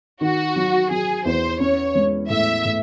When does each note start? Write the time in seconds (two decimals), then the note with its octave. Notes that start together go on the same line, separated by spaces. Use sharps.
0.21 D#3 F#4
0.56 F#3
0.91 F#3 G#4
1.25 E2 C5
1.60 C#4 C#5
1.95 G#3
2.30 A2 E5
2.65 A2